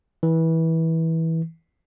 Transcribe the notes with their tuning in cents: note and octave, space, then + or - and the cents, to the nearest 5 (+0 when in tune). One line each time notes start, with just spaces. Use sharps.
E3 -20